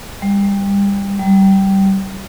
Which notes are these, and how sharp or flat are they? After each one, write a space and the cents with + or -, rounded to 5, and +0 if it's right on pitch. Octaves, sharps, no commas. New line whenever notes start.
G3 +25
G3 -15